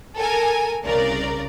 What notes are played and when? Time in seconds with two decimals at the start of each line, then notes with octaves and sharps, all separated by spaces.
0.16 A4 A#4 G#5
0.85 C2 C#3 A#4 D5